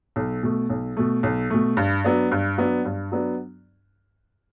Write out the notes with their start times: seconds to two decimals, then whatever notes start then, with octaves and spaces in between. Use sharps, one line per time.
0.16 B1
0.43 B2 A3
0.70 B1
0.97 B2 A3
1.23 B1
1.50 B2 A3
1.77 G2
2.05 F#3 B3 D4
2.31 G2
2.58 F#3 B3 D4
2.85 G2
3.12 F#3 B3 D4